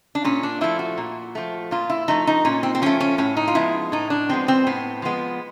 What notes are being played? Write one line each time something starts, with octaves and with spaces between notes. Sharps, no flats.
D4
A#2 C#4
D4
F3 A3 E4
F#4
A#2
F3 A3
A#2 F4
E4
F3 A3 D#4
D#4
A#2 C#4
C4
C4
F3 A3 C#4
C#4
A2 C#4
D#4
F4
F3 G#3 B3 E4
A2 D#4
D4
F3 G#3 B3 C4
C4
A2 B3
F3 G#3 B3